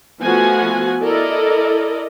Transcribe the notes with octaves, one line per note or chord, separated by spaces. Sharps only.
F3 A3 B3 F#4 F#5 G#5
E4 A4 A#4 D5 D#5